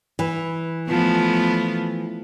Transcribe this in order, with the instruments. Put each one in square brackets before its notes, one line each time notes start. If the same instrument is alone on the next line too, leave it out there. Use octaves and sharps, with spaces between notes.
[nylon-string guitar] E3
[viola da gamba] F3 A3 B3